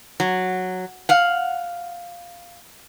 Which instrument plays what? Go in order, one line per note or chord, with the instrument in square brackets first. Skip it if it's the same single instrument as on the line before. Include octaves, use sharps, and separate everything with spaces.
[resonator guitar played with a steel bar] F#3
F5 F#5